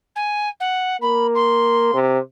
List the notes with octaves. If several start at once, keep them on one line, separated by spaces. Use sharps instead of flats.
G#5
F#5
A#3 B5
C6
C3